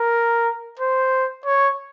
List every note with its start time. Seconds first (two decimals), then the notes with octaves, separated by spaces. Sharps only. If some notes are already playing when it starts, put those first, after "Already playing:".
Already playing: A#4
0.79 C5
1.46 C#5